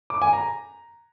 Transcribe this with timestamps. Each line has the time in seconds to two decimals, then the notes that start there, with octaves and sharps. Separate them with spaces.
0.10 D6
0.22 G#5
0.33 A#5